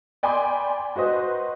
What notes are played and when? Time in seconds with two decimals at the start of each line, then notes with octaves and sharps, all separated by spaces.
0.23 D5 G5 G#5 B5 C6 D6
0.96 F#4 B4 C5 D#5